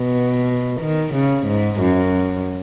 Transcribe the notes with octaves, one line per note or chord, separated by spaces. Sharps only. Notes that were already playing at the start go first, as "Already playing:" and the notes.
Already playing: B2
D#3
C#3
G#2
F#2